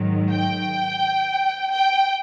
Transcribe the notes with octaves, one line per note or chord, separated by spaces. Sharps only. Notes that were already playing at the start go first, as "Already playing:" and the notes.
Already playing: G#2 D#3 F#3
G5
G5